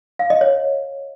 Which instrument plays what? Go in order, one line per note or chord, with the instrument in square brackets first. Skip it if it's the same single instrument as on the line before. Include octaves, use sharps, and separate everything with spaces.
[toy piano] F5
D#5
C#5